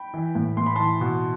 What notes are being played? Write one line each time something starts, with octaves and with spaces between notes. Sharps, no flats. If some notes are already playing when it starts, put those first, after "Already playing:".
Already playing: G5 B5
E3
A2
A2 C6
B5
E3 A5 C6
B2